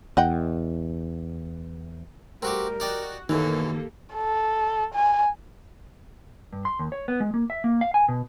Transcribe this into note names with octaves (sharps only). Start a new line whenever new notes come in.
E2 D#5 F#5 G5
G3 A3 C4 F#4 G4 A#4
D#4 F#4 D5 G5
F#2 B2 D#3 E3 A#3 G4 A4
A4
G#5
G2
C6
D#2
C#5
B3
G#3
A#3
E5
A#3
F5
G#5
B2